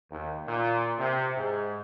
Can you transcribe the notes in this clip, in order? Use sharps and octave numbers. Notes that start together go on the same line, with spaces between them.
D#2
A#2
C3
G#2